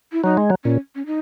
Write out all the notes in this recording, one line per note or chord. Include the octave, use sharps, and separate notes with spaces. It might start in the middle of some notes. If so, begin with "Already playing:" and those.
E4
F#3 D#4
G#3
F#3
A#2 C#4
C#4
D#4